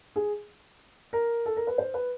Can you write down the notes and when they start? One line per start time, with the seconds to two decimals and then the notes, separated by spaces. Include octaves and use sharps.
0.16 G#4
1.13 A#4
1.46 A4
1.57 A#4
1.67 B4
1.78 C5
1.94 B4